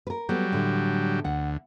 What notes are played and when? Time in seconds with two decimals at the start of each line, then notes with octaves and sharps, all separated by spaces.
0.07 A#4 B4
0.29 F#3 G3 A3 B3
0.52 A2 D3
1.25 D2 F#5